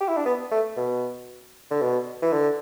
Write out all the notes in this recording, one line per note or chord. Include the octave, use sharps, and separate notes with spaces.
G4
E4
D4
B3
A3
B2
D3
B2
E3
D3